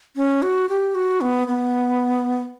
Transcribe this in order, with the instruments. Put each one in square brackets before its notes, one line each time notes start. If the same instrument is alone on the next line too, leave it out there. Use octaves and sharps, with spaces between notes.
[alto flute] C#4
F#4
G4
F#4
B3
B3